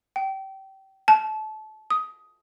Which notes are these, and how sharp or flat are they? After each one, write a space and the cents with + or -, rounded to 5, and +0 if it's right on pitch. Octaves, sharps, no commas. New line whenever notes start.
G5 -25
A5 -25
D#6 +15